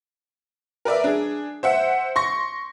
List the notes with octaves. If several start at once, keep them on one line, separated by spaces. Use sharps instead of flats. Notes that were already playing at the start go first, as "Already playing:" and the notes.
A#4 B4 D5 E5
D4 G#4
C5 E5 F#5
C6 C#6 A#6